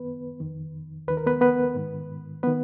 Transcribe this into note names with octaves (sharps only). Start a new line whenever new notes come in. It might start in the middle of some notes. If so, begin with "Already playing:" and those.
Already playing: F#2 D#3 B3 B4
F2 D#3
D#2 D#3 B4
A#4
B3 B4
B3 B4
G#2 D#3
D#3 B3 B4